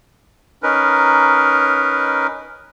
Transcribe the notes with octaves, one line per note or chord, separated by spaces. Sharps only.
C#4 D#4 A#4 B4